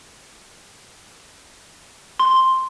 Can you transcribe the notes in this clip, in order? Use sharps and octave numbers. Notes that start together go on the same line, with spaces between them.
C6